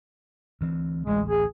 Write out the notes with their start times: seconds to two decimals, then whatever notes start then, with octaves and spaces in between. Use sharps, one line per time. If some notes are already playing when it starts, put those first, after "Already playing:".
0.61 D2 E3 C4
1.07 A1 D2 G#3
1.29 G#4